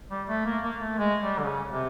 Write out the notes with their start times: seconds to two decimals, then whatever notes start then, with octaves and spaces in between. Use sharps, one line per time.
0.10 G3
0.28 A3
0.45 A#3
0.63 A#3
0.81 A3
0.98 G#3
1.21 G3
1.39 D3
1.45 C#3
1.67 C3